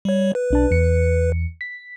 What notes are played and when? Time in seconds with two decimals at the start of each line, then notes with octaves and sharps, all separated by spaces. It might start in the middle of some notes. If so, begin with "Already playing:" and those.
0.05 G3 C#5
0.35 B4
0.51 B1 D4 A5
0.71 E2 C#7
1.61 B6